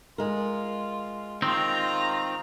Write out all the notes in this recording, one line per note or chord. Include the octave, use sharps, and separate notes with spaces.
G#3 F4 A#4
D#3 C4 F4 A#5